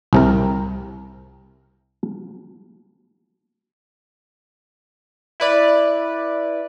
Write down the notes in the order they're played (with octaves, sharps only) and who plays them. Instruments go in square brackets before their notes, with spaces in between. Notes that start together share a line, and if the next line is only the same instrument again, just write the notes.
[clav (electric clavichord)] C2 C3 A#4
[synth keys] E4 B4 D5